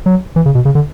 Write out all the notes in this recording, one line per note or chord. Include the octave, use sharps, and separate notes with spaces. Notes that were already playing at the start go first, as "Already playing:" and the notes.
F#3
E3
C#3
B2
C#3
D3